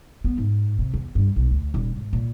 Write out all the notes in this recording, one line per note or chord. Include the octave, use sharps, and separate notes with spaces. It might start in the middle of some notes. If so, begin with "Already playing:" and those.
B3
G#2
C3
E2
G2
B1
D2
D#1
G#1
A#2